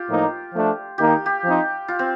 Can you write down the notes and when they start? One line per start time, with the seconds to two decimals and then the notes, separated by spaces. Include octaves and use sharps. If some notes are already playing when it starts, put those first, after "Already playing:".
Already playing: F4 G4
0.09 A2 F3 A#3 D#4
0.53 F3 A3 D4
0.98 D#3 A#3 D#4 G4
1.26 G4
1.43 F3 C4 D#4
1.88 F4
1.99 C4